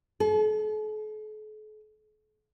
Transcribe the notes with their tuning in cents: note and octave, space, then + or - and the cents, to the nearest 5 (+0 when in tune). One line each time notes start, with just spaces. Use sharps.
A4 -45